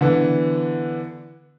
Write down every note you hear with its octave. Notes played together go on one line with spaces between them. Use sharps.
D3 E3 B3